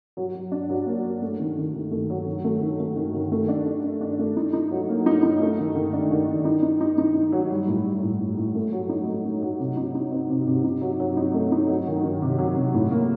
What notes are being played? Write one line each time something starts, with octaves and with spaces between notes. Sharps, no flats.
F#3
F#3
D4
F#3
A#3
A#3
A3
D#3
D#3
D#3
A3
F#3
D#3
A3
D#3
A3
D#3
D#3
A3
D4
D4
D4
D4
A3
D#4
D#4
F#3
A#3
D#4
D#4
A3
D#3
D#3
D4
D#3
D#3
D#4
D#4
D#4
D#4
D#4
F#3
G3
A2
G3
A2
A2
A2
A3
F#3
D#4
A3
A3
F#3
C3
D#4
D#4
C4
C3
C3
D#4
F#3
F#3
D#4
A3
D#4
F#3
D#3
D#3
C3
F#3
C3
A2
A#3